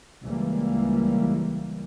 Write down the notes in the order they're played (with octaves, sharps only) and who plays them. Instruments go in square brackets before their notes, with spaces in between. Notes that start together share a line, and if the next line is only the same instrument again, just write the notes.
[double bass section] C#2 E3 G3 A#3